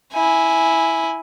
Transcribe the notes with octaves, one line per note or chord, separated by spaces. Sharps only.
E4 G#5